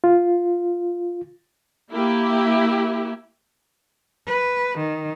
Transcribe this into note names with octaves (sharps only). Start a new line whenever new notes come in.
F4
A#3 E4 G4
B4
D#3